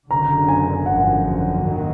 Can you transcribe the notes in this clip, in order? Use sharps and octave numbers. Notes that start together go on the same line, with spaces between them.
F#1 F#2 D3 A#5
G#5
G#1 F#2 D3 F3 F#5
D#2 D#3 F#3 A#3